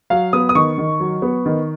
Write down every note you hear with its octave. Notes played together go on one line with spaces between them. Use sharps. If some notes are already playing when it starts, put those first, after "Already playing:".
F#3 F5
B3 D#6
D#6
D#3 C#6
D#3
F#3
B3
D#3